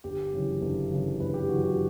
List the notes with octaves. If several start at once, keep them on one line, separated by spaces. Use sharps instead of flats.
G1 G4
F#2 C#3 E3
G1
F#2 C#3 E3
G1 B4
G4
F#2 C#3 E3 F#4
F#4